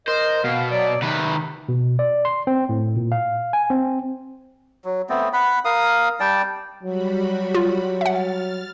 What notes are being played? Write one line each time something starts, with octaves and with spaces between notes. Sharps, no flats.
A#4 C5 D#5
B2 F5
F#3 D5
C3 D#3 B4
B2
D5
C6
C4
A2
A#2
F5
G#5
C4
F#3
A3 B3 C4
F#5 B5
A#4 F5 D#6
G3 D5 G5 A5
F#3 G3 F#4 B5
F4
E5 F#5 F6 A6